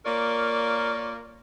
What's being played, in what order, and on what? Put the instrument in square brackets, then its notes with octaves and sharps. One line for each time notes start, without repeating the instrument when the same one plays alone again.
[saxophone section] A#3 F4 A#4 C#5 D5